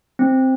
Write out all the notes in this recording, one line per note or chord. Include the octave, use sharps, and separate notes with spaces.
C4